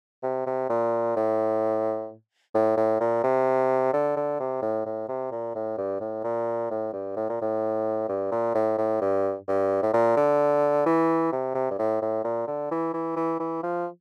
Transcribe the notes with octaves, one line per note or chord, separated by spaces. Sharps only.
C3
C3
A#2
A2
A2
A2
A#2
C3
D3
D3
C3
A2
A2
C3
A#2
A2
G2
A2
A#2
A2
G2
A2
A#2
A2
G2
A#2
A2
A2
G2
G2
A2
A#2
D3
E3
C3
C3
G2
A2
A2
A#2
D3
E3
E3
E3
E3
F3